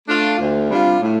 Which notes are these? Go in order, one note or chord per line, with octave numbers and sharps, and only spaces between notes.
A3 D4 F4
D2
C3 G3 D4 F4
A2